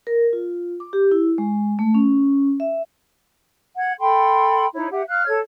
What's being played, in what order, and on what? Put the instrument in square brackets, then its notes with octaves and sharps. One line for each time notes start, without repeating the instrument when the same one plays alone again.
[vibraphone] A#4
F4
D6
G4
E4
G#3
A3
C#4
E5
[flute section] F#5 G#6
A4 G5 B5 C6
D#4 E4 C#5
G4 E5 F#5
F5 F6 F#6
A4 C#5 G#6